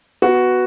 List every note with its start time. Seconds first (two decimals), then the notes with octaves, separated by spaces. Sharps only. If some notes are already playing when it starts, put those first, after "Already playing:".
0.22 B3 F#4